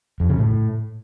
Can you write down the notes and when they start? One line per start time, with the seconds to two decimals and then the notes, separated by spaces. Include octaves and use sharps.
0.20 F2
0.29 C#3
0.38 A2